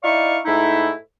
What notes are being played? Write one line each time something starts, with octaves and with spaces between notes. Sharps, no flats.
D#4 E4 D5 F5 C#6
G#2 A3 D#4 E4